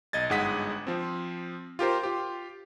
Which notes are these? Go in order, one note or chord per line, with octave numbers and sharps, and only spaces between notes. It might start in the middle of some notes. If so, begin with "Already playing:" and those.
B1 D#5 G#6 A6
G1 G#2 G#3 F#5 D#6 B6
F3 C4
F4 G4 A#4 C5
F4 G4